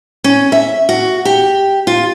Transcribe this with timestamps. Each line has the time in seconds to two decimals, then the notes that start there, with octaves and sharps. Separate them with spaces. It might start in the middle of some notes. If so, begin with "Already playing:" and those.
0.24 C#4
0.52 E5
0.89 F#4
1.25 G4
1.87 F4